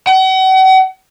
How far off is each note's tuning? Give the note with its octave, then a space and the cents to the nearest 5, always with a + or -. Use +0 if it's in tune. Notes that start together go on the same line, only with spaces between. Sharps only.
F#5 +40